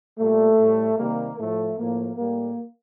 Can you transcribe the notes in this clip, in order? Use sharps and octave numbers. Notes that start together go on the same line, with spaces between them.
A#2 G3 A3
A2 G3
C3 D#3 G3 A#3
A2 F3 A3
A2 F3 A#3
A2 G3 A#3